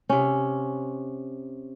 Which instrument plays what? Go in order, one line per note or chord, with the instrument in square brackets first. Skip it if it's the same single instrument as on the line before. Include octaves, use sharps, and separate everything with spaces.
[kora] C3 C#4